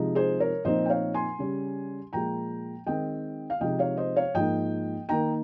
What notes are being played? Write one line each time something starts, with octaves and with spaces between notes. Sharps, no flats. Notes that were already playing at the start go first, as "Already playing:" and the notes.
Already playing: C3 F3 G#3 D#4
G#4 C5
A#4 C#5
A#2 F3 C4 D#4 C5 D#5
G5
C#5 F5
G#5 C6
C#3 G3 C#4
A#2 F3 G#3 G5 A#5
D#3 G#3 C4 D#5 G5
F5
C3 F3 G#3 D#4 D#5 G5
C#5 F5
C5 D#5
C#5 F5
G#2 F3 A#3 D#4 D#5 G5
D#3 A#3 D#4 G5 A#5